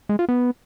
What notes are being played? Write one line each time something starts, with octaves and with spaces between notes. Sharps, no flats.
G#3
F4
B3